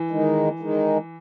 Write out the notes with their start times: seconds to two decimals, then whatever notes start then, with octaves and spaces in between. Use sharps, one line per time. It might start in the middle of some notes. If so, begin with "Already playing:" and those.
Already playing: E3
0.11 D#3 G#3 D#4
0.59 D#3 G#3 D#4